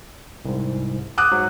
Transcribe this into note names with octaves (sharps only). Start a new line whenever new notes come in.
C2 G#2
D6 D#6 F#6
G#2 F#3